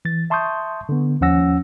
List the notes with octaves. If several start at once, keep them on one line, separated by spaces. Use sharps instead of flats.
E3 A6
E5 A5 C6 C#6 D#6 G6
D3 B3
D#2 F3 C#4 F#5 E6 A#6